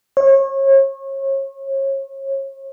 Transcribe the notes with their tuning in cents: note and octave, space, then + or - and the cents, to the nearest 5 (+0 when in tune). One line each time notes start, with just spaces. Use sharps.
C#5 -35